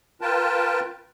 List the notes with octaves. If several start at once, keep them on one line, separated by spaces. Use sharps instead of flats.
F4 A#4 B4 G5 A5